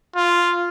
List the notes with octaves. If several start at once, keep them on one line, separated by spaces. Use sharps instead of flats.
F4